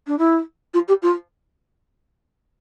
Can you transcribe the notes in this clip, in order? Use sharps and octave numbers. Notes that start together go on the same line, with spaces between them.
D4
E4
F4
G4
F4